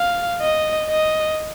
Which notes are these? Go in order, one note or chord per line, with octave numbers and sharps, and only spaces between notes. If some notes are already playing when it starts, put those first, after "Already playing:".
Already playing: F5
D#5
D#5